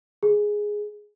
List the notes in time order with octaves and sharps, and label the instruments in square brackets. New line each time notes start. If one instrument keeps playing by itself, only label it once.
[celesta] G#4